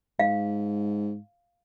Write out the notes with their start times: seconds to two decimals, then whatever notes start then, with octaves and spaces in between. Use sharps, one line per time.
0.19 G#2 F5